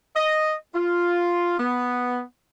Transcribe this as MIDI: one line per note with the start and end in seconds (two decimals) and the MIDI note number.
0.15 0.54 75
0.74 1.58 65
1.58 2.22 59